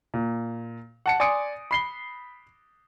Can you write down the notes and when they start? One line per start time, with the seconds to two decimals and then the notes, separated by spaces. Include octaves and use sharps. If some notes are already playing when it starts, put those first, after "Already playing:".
0.14 A#2
1.06 F#5 A5 C#7
1.20 D5 G#5 C6 D#6 C#7 D7
1.71 B5 C7 G7